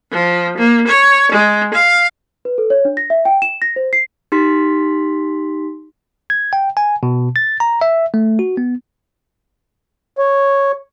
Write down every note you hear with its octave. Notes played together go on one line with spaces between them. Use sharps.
F3
A#3
C#5
G#3
F5
B4
A4
C#5
D4
A#6
E5
G5
E7
A#6
C5
C7
D#4 G4 C6 B6
G#6
G5
G#5
B2
A6
A#5
E5
A3
F#4
B3
C#5